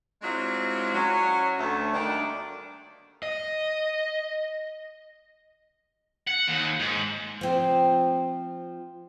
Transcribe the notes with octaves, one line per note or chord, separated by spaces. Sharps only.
F#3 G#3 C4 D4 E4 F4
F#3 C#4
D2 A3
D#3 G3 A#3 B3 D4 D5
D#5
F#5
D#2
G#2
F3 C4